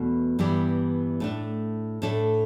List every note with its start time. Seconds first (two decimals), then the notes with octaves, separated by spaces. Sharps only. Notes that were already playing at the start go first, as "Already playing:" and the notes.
Already playing: E2 B2 A3
0.39 G2 E3 B3 G4 D5
1.20 A2 A3 D4
2.02 A2 A3 D4 A4